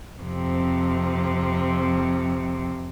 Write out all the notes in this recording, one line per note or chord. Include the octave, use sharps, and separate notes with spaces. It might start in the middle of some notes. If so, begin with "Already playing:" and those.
F2 C3